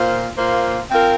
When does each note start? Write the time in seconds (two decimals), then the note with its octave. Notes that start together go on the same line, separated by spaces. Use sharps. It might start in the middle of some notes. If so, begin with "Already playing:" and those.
Already playing: A#2 A#3 F4 C5
0.37 A#2 A#3 F4 C5
0.89 C4 F4 A#4